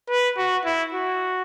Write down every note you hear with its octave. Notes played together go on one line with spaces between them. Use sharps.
B4
F#4
E4
F#4